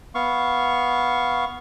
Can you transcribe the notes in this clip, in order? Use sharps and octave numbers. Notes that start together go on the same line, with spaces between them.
B3 F5 C#6